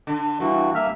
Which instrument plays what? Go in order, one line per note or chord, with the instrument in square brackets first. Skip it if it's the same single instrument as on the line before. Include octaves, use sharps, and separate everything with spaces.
[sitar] D3
[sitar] G2 [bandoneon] E3 F#4
[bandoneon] A#3 E5 F6